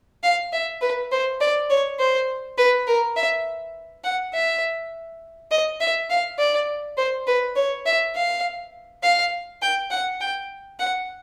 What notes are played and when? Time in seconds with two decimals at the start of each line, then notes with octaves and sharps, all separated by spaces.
0.24 F5
0.53 E5
0.82 B4
1.12 C5
1.41 D5
1.70 C#5
1.99 C5
2.58 B4
2.87 A#4
3.16 E5
4.04 F#5
4.34 E5
5.51 D#5
5.80 E5
6.10 F5
6.39 D5
6.97 C5
7.27 B4
7.56 C#5
7.86 E5
8.15 F5
9.03 F5
9.62 G5
9.91 F#5
10.21 G5
10.79 F#5